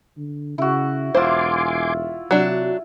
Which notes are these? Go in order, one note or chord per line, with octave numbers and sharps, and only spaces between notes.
D3
C#3 E4 F#4
E1 E4 F4 C5 G#5 C6 D6
C3 F#3 D4 F#4